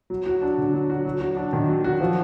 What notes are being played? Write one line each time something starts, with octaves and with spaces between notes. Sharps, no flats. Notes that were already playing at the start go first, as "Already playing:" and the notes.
F#3
F#4
D4
D3
F#3
F#4
F#3
F#4
D4
D#3
F#3
F#4
F3